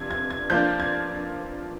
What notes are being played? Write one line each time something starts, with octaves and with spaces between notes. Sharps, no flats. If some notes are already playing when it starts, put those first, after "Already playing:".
Already playing: C3 F3 G#6
G#6
G#6
F3 A#3 D4 G6
G#6